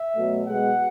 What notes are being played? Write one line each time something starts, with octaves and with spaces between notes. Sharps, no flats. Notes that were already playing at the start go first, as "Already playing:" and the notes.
Already playing: E5
B2 F#3 A3
B2 G#3 F#5